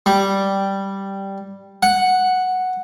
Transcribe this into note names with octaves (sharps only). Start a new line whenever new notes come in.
G3
F#5